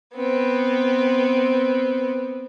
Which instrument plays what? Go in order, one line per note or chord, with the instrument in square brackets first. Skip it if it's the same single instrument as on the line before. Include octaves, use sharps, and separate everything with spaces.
[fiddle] B3 C4